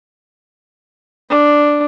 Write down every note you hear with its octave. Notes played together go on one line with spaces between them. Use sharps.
D4